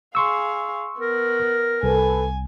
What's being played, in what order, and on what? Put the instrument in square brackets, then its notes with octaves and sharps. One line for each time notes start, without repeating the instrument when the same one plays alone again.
[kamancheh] G#4 F5 [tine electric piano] C6 C#6 E6
[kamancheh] B3 [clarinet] A#4
[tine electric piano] C2 [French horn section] A4 B4 [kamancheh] G#5